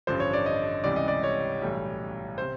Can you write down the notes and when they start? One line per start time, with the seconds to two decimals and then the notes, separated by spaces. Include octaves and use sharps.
0.07 A1 G2 D3 F3 C5
0.20 C#5
0.33 D5
0.46 D#5
0.84 C#2 C3 E3 G3 D5
0.96 D#5
1.08 D5
1.23 C#5
1.62 B1 A2 E3 G3
2.38 C3 C5